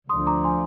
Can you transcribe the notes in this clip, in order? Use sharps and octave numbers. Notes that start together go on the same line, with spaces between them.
D2 D3 F3 C6 D#6
A#5 D6
G#5 C6